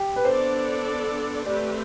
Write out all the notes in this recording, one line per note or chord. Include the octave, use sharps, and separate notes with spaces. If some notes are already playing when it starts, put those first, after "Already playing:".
Already playing: G4
B4
B3 D4 A4 C5 D5
A3 C4 G4 B4 D5